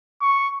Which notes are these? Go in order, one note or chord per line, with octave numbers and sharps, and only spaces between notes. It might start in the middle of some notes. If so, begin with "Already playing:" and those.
C#6